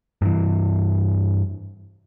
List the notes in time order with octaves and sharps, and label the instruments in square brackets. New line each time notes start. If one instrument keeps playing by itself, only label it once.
[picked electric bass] G2 E3